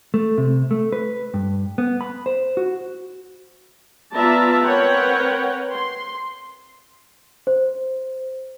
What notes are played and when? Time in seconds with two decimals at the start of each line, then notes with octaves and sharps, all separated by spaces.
0.14 A3
0.38 C3
0.71 A3
0.93 B4
1.34 G2
1.78 B3
2.01 B5
2.26 C5
2.57 F#4
4.15 B3 F4 D5 E5 A5 A#5
4.64 C4 A#4 B4 C#5 F#5 G5
5.73 C6
7.47 C5